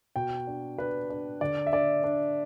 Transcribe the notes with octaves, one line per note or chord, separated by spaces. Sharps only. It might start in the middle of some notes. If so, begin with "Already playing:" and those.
B2 G5
D4
D4 B4
D4
D3 D5
E5
D4 D5
D4